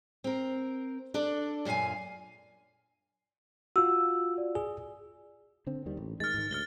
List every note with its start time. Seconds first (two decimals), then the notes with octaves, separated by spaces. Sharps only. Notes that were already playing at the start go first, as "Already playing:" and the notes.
0.24 C4 A#4
1.14 D4 A4 D5
1.65 F#2 A#2 D4 F5 G#5
3.76 F4 F#4 E6
4.38 D5
4.55 G#4
5.67 D3 C4
5.86 D#2 D#3 G3
5.97 A1
6.20 D#3 G#3 F6 A6
6.34 G#2 D#3
6.51 D2 F6 A6 G7